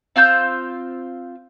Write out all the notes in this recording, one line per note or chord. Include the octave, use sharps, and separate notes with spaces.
C4 F4 E6 G6